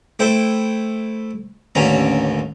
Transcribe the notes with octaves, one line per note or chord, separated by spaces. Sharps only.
A3 E4 C5 G5
A1 D#2 D3 C#4 A#5